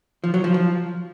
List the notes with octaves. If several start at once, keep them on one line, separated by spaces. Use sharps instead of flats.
F3
F#3
F3
F3